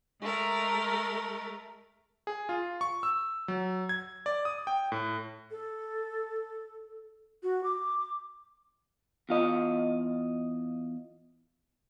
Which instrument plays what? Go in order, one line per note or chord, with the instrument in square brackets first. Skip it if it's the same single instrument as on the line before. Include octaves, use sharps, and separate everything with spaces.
[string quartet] G#3 A3 A#4
[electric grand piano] G#4
F4
C#6
E6
F#3
G#6
D5
D#6
G5
A2
[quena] A4
F#4
D6
[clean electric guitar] E2 F4 D#5